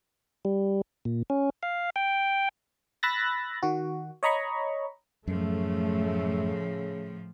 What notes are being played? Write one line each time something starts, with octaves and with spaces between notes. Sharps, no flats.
G3
A#2
C#4
F5
G5
B5 E6 F#6 A6 A#6
D#3 F#4
C#5 D#5 A#5 B5 C#6
F#2 A2 C#3 F3 A3